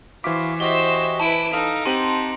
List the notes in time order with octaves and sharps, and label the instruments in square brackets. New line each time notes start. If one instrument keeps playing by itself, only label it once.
[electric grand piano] E3 D6 [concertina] E4 F#4 F5 [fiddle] C5 [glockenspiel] B6
[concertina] F#4 G4 D#5 [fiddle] C5 E5 [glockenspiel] G7
[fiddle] E4 B4 [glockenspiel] A5 D7
[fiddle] D#4 [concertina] A4 F5 D#6
[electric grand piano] C4 G4 D#7 [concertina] C5 F#5 A5 [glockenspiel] C6 F#7